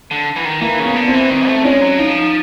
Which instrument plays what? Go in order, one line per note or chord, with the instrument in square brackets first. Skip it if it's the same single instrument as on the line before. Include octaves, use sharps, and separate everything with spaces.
[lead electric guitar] D3
E3
D#3
[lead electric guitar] E3 [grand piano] A#3
[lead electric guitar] C#3
[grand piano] B3
[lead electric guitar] D3
[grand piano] C4
[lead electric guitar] E3
[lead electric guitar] D#3 [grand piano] C4
[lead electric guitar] A3
[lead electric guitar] G#3 [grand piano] C#4
[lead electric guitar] F#3
[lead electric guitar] F3 [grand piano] D#4